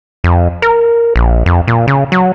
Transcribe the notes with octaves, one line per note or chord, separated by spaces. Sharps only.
F2
A#4
A#1
F2
A#2
C#3
F#3